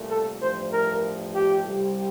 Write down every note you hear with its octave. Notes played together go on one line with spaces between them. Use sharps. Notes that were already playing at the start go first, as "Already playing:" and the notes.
Already playing: C2 A#2 A3
A4
A1 G2 F3 A3 C5
A#4
G4
C2 C3 G3